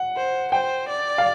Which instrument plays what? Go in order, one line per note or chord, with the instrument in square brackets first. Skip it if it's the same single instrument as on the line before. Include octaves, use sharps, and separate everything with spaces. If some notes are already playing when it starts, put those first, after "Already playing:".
Already playing: [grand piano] F#5
[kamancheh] C5
[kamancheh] C5 [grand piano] G5
[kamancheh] D5
[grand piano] F5